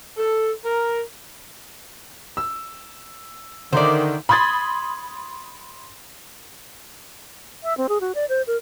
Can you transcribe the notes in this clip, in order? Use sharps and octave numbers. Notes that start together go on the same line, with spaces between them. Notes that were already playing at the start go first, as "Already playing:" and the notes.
A4
A#4
E6
D3 D#3 C5 D5 E5 D6
B5 C6 D#6 G#6 A6
E5
C4
G#4
F#4
D5
C5
A#4